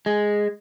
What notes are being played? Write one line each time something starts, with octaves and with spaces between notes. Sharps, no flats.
G#3